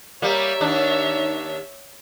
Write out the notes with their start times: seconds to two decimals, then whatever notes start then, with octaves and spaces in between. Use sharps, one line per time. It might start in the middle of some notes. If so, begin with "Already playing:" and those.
0.22 G3 A#3 C#5 E5
0.61 D#2 D4